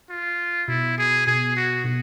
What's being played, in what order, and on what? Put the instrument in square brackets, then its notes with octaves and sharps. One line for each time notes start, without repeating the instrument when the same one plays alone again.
[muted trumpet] F4
[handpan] B2 [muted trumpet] E4
[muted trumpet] G#4
[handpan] B2 [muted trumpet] G#4
[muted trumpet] F#4
[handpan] B2